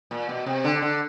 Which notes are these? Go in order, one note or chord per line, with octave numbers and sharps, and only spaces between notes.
A#2
B2
C3
D3
D3